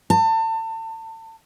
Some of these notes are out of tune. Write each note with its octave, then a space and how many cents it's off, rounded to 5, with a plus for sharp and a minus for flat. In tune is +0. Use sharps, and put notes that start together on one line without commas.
A5 +35